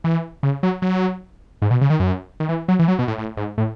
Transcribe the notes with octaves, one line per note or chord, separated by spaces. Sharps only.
E3
C#3
F#3
F#3
G#2
B2
C#3
D#3
F#2
D#3
E3
F#3
E3
F#3
B2
A2
A2
G#2
A2